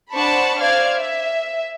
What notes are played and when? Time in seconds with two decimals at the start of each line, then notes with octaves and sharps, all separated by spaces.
0.13 D4 C5 F#5 A5 B5 C#6
0.58 C5 D5 F5 F6 G#6
0.96 E5